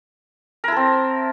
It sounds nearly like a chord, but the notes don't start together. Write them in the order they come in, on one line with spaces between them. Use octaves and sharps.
A#4 E4 A4 C4